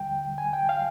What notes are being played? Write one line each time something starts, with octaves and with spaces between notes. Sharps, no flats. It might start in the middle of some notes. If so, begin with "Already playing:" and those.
Already playing: D#2 D3 G3 G5
G#5
G5
F5